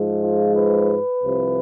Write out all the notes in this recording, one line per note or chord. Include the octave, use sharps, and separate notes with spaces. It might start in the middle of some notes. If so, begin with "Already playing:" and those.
Already playing: G#2 F3 G#3
F4
B4
C2 C3 F3